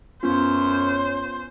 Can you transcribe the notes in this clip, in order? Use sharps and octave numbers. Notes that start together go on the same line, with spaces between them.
F#2 B3 C#4 F4 C5